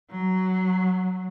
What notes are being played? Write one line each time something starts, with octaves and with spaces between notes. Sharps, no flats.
F#3